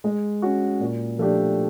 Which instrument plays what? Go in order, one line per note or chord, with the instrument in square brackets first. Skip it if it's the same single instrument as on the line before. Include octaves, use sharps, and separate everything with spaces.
[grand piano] G#3
C#4 F#4
A#2
F3 A3 D4 G4